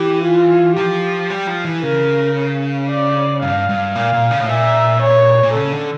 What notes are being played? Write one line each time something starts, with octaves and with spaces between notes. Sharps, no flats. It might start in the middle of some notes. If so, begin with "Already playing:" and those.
Already playing: E3 G4
F4
F3 G4
G3
F3
E3
C#3 A#4
D5
G2 F5
G2
A#2 F5
A#2
C#3
A2
A#2 E5
C#5
A#2
C#3 A4
D3